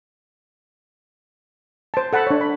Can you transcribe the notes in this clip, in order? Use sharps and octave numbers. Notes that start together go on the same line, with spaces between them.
C5 A5
A4 F#5 A5 B5
D4 C#5
B5